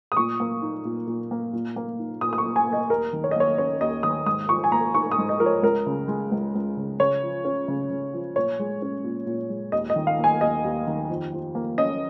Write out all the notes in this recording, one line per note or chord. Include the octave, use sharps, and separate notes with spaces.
D#6
A#2 C#6
A#3
D#4
A#2
A#2
A#3
A#2
A#3
D#4
A#2 D#6
D#6
C#6
A#2
G#5
A#3
D#5
D#2 A#4
D#3
C#5
D#5
A#3 C#5
C#4 C#5
D#2 D#5
D#3 D#6
G#2 D#6
F3 C#6
G#5
A#3 A#5
D#4 C#6
D#6
G#2
D#5
F3 A#4
C#5
C#2 A#4
C#3
G#3
C#2
C#2
C#3
C#3 C#5
F3
C#4
C#3
C#3
F3
A#2 C#5
G#3
C#4
A#2
A#2
G#3
D#2 D#5
D#5
D#3
F5
A#3
G#5
D#2 D#5
D#2
D#3
F2
F3
A#3
C#4 D#5